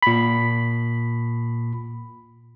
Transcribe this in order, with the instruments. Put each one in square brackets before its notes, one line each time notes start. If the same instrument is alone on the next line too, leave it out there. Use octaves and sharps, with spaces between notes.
[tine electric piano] A#2 B5